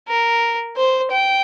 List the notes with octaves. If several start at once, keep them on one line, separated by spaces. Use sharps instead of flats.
A#4
C5
G5